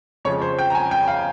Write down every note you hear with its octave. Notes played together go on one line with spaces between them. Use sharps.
F2 C#3 F3 G#3 C#5
C5
G5
A#5
G#5
G5
F5